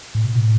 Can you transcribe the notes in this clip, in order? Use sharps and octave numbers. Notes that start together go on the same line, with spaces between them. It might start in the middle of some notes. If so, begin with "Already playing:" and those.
A2
B2
A2